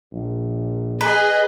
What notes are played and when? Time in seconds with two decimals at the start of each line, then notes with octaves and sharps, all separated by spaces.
0.13 A#1
1.01 G#4 B4 D#5